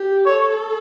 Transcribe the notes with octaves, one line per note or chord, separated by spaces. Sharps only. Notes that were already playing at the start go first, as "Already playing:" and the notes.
Already playing: G4
A4 C#5